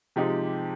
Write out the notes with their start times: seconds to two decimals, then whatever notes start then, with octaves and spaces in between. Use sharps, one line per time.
0.16 C3 F3 G#3 D#4 G4